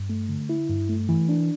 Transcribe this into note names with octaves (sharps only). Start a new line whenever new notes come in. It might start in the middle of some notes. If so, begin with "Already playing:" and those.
Already playing: G2
A3
D3
E4
G2
A3
E3
D4